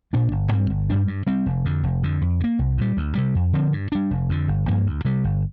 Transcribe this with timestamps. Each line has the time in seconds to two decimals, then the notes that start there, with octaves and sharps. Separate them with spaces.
0.13 A#2 A#3 D4
0.32 G1
0.52 G2 G3 C4
0.70 G1
0.90 G2 G3 D4
1.08 G2
1.27 G3 C4
1.46 F1
1.65 F2 D3
1.84 F1
2.03 F2 D3
2.21 F2
2.40 D3
2.44 A#3
2.59 C2
2.78 A#2 G3
2.97 D2
3.15 C3 G3
3.35 F2
3.53 D3 F3 C4
3.72 G2
3.92 G3 D4
4.11 F1
4.29 F2 D3
4.48 G1
4.68 G2 F3 A#3
4.86 D2
5.05 C3 G3
5.24 G1